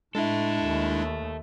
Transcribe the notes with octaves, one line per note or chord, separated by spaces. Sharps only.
A2 G#3 D4 E4 A4 E5
D#2